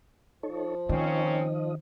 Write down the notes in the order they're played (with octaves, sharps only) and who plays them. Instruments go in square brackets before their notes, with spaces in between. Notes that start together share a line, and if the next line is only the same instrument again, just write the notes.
[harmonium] F3 [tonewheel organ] D#4 A4 C#5
[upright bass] D#3 [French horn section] A#3 C4 C#4 [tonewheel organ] D#4 F4 D#5